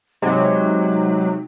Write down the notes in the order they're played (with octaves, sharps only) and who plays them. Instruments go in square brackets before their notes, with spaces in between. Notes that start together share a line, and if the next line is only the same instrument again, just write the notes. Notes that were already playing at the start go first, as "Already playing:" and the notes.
[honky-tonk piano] C3 [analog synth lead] F#3 [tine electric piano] G#3 [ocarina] D#4